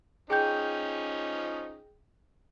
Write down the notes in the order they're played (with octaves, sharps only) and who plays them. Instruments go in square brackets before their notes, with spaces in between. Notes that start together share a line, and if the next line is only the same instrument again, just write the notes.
[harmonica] F3 C#4 D#4 [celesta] G#4 G5 G6